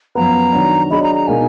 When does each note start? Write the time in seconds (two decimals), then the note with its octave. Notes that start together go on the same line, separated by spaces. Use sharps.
0.15 F#2 F3 B3 A#5
0.52 D#3 F#3 D4
0.91 F#3 D4 G#4 D#5 B5
1.03 A#5
1.15 A#5
1.27 B2 G#3 D#4 A#4 F5 G#5